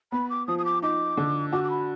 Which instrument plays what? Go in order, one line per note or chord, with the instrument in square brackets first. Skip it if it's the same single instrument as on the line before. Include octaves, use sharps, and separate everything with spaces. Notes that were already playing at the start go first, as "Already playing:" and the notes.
[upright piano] B3 [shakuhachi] B5
[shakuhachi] D6
[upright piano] F3 [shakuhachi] D#6
[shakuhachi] D#6
D6
[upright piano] D#4 [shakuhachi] D6
[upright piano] D3
[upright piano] F#4 [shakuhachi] D6
[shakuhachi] D6
B5